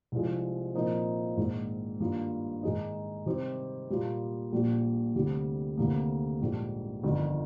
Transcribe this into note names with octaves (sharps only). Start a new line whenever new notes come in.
C2 C3 F3 G#3
A#2 F3 C4 D#4 A#4
A#1 G#2 D#3
G2 D#3 A#3 F4
G#2 D#3 G#3 D#4
C3 D#3 G3 C4 G4
A#2 G3 A#3 F4
A#1 A#2 G3
D2 C3 G3
D2 C3 D#3 A#3
A#1 G#2 G3 A#3
G1 F2 D#3